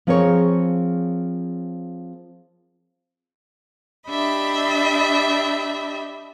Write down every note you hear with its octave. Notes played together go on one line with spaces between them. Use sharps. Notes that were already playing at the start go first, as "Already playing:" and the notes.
F3 C4 G#4 A#4 C#5
D4 G4 D#5 E5 B5